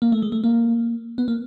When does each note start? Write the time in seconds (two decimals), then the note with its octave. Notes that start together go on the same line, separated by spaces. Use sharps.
0.02 A#3
0.12 A3
0.22 G#3
0.32 A3
0.44 A#3
1.18 B3
1.28 A#3